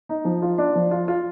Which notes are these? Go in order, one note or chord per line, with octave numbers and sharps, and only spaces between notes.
D#4
F3
F4
D4
F3
F4
F4